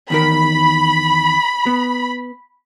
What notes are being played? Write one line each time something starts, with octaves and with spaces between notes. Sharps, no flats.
E2 D#3 A#4 B5
B3